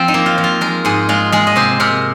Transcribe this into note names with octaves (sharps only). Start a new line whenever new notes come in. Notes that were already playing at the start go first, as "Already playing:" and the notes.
Already playing: F3 C4
D#4
A#3
F4
F3
F4
G#3 A#4
G#2 G#4
G#3 F4
G#3 G#4
D#5
C3 C5
C3 A#4